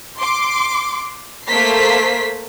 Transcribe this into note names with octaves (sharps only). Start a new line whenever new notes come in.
C6 D6
A3 A#3 A#4 C5 B6 C7